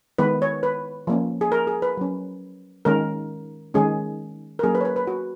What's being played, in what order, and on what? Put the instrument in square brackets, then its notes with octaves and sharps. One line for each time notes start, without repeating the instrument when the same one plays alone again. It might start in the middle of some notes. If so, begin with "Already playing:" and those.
[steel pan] D#3 G#3 B3 B4
C#5
B4
F3 A#3 C#4
G#4
A#4
G#4
B4
F#3 C#4
D#3 G#3 C#4 A#4
D#3 G#3 C#4 G#4
A#4
F#3 A#3 C#4 G#4
B4
C#5
B4
B4
F#4